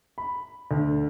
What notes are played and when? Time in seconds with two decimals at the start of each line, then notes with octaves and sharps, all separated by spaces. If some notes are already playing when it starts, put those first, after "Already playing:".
0.18 B5
0.71 D2